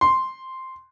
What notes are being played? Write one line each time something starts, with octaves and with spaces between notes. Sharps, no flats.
C6